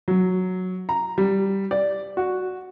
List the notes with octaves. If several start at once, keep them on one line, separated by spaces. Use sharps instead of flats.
F#3
A#5
G3
D5
F#4